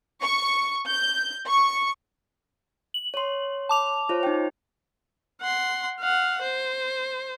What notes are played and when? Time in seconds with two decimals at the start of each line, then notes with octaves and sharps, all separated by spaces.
0.22 C#6
0.87 G6
1.46 C#6
2.94 F#7
3.14 C#5 C6
3.69 A5 D6 F7
4.09 F4 C5 C#5
4.23 D#4 G5
5.41 F#5 C6
6.00 F5 F#5
6.42 C5